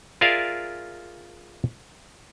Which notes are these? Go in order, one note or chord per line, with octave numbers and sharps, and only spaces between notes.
F4 G#4 A#4 D5 E5 F5